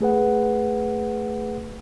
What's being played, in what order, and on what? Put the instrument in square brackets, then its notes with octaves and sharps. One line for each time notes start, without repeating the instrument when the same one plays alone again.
[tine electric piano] A3 G#4 B4 F#5